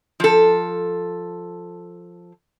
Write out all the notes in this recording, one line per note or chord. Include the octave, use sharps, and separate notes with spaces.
F3 A4